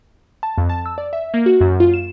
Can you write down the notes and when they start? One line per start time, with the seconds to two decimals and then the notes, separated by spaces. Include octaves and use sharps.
0.43 A5
0.58 F2
0.69 A5
0.86 E6
0.98 D5
1.13 E5
1.34 A#3
1.46 F#4
1.61 F#2
1.80 F4
1.94 E7